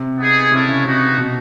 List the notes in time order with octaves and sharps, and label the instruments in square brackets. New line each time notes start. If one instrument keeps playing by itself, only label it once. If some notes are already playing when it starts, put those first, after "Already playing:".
Already playing: [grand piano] C3
[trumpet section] B3 D#4 G#4
[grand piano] C3 [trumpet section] G#3 C#4 E4 A4 C#5
[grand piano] C#3
[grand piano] C3 [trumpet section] B3 D#4 F#4
[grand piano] B2